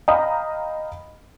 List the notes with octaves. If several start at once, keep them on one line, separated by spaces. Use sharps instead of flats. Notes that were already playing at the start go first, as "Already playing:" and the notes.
D#5 F5 G5 A#5 B5 D#6